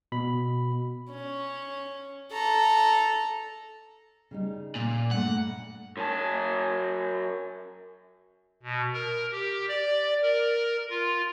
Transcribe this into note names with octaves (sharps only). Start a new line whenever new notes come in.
B2 B5
C#4
A4 A#5
C#3 G3 D#4
A#2 F5
G2 C3 A3 F#5
F#2 A5
B2
A#4
G4
D5
A#4
F4